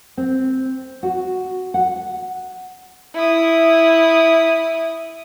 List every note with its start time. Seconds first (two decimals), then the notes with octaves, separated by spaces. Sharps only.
0.17 C4
1.03 F#4
1.74 F#5
3.15 E4 D#6